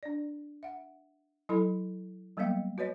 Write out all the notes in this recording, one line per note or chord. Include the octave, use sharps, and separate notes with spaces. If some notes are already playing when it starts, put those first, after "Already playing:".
D4 D5
E5 F#5
F#3 E4 A4 B5
F#3 G3 A#3 B3 D#5 F5
F#4 B4 C#5 D#5